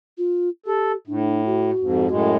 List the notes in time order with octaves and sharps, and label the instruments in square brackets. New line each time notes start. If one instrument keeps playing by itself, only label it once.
[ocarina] F4
[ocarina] G4 [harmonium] A4
[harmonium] A2 [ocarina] D4
[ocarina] F#4
[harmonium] F2 G#2
[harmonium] F#2 A2 G#3 [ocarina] F#4